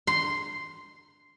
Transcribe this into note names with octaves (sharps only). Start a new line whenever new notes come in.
C6